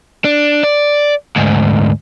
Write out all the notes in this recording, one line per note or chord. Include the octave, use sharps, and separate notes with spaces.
D4
D5
D2 G#2